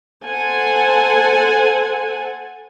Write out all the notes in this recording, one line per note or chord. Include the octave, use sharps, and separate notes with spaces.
A4 C5 F#5 G#5 A5